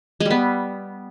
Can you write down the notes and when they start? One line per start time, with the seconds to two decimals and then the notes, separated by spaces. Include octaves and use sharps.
0.20 G#3
0.25 G3
0.31 B3